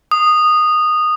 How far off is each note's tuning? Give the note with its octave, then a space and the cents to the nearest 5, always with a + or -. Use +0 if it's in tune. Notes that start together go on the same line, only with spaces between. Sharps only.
D#6 -15